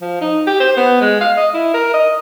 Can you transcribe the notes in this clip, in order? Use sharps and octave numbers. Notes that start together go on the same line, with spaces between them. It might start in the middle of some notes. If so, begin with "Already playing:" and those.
F3
D#4
G4
C5
B3
G#3
F5
D#5
E4
A#4
D#5